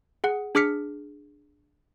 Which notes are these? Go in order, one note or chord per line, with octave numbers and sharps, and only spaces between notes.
G#4 F#5
D4 G#4 D6 F6 B6 C#7